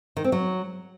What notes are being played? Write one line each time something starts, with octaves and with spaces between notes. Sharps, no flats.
D#3
C4
F#3